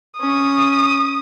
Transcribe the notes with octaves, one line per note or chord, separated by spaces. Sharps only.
C#4 D#6